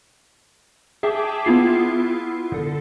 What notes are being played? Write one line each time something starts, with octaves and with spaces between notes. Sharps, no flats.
G#4 E5 G5 A5 D6
B3 E4 F4 C7
D3 A4